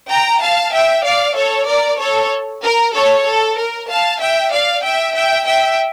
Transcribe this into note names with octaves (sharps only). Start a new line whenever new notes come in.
G5 A#5
F5 A5
E5 G5
D5 F5
A4 C#5
A#4 D5
A4 C#5
A#4
A4 C#5
A4
A#4
F5 A5
E5 G5
D5 F5
E5 G5
E5 G5
E5 G5